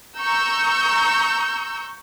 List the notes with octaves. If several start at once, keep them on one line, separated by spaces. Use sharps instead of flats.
A#5 C#6 E6 G6